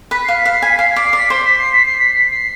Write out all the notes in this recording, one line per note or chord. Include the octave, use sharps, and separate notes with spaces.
B4 B6
F5 C7
B6
F5
C7
G#5 B6
F5 C7
D5 B6
C7
D5 B6
C5 C7
B6
C7
B6
C7
B6
B6
C7